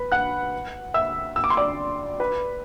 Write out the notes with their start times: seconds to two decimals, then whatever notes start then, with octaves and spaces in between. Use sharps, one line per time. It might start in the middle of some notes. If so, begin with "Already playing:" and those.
Already playing: B4 B5
0.12 F#5 F#6
0.94 E5 E6
1.36 E6
1.44 D6
1.50 C6
1.57 D5 D6
2.20 B4 B5